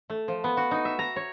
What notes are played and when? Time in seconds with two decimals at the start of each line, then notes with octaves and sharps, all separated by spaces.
0.10 A3
0.28 F3
0.44 B3
0.57 F#4
0.71 D#4
0.85 E5
0.99 A#5
1.16 C#5